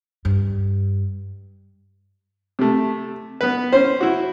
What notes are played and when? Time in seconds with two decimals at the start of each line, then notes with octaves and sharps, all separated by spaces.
0.25 G2
2.59 C3 A3
3.41 B3 B4
3.73 C#4 C5
4.01 E4 F#4